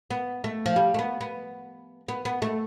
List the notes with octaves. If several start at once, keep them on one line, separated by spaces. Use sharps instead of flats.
B3
A3
F3
G3
A3
B3
B3
B3
B3
A3